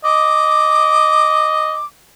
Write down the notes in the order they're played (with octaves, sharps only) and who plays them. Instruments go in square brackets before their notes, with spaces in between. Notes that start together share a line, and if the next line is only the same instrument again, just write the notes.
[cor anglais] D#5 [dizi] D6